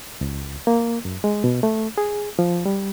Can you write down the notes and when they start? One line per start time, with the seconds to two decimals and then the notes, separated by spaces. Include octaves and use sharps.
0.21 C#2
0.67 A#3
1.05 F#2
1.24 G#3
1.44 B2
1.63 A3
1.98 G#4
2.39 F3
2.66 G3